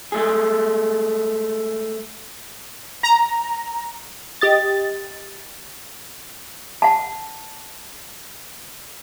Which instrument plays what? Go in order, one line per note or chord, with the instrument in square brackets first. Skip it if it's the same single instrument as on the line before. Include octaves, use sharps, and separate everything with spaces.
[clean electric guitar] G#3 A3 G#4
[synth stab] A#5
G4 D#5 A6
[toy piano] F#5 A5